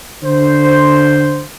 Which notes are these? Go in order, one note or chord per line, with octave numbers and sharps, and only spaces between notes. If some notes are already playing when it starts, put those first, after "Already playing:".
D3 C5